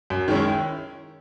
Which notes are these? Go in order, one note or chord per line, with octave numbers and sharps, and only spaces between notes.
F#2
D#3 G#3 C#4 E4